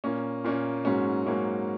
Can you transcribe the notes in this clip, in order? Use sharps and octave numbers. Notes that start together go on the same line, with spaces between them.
A#2 A#3 C#4
A#2 A#3 C#4
G#2 F#3 A#3 C#4
G#2 F#3 A#3 C#4